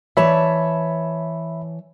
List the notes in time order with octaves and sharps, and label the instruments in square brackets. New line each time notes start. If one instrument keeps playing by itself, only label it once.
[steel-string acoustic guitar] E3 C#5 A5 [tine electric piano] E5 B5